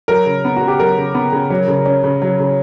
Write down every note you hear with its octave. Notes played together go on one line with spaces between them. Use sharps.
F#3 A#4
C#3
B3
C#3 F#4
G4
F#3 A#4
C#3
B3
C#3
F#3
C#3
C#4
C#3
F#3
C#3